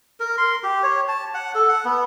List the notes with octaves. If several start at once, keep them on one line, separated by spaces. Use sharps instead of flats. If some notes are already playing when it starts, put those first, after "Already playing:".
A#4
C6
G4
C#5
A5
F#5
A4
F#5
B3